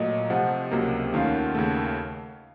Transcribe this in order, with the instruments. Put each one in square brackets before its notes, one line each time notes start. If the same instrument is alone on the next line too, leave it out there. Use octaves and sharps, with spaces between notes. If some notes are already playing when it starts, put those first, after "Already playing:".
Already playing: [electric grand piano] A#2 F#3 A3 [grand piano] D#5
[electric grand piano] C3 F3 A3 [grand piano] F#5
[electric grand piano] C#2 C3 F#3 A#3
[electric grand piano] D#2 D#3 A3 C#4 F4 [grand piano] F5
[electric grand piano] D#2 C#3 A3